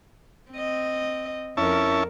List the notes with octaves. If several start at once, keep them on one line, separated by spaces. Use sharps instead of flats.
C4 D#5
F2 C#4 E4 A#4 A5